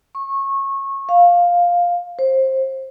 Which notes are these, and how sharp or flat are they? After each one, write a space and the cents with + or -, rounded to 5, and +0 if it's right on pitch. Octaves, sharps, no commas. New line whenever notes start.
C#6 -20
F5 +5
C5 +20